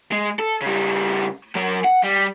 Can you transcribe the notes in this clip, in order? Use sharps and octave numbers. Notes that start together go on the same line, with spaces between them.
G#3
A4
C#3 G3
F#3 A#4
F#5
G3